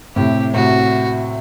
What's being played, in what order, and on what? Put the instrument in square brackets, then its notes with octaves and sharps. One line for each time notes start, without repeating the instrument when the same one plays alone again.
[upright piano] A2 C3 [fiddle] G4
[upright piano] A2 C3 [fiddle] F#4